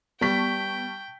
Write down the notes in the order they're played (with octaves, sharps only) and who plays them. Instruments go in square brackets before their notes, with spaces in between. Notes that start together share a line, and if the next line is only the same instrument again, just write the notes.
[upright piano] G3 [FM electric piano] B3 [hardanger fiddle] G5 [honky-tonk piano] A5 C#6 B6